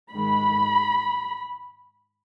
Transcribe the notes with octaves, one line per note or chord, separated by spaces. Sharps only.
G#2 D#3 G#3 B5